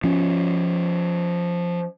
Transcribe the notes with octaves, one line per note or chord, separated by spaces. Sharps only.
F3 C#4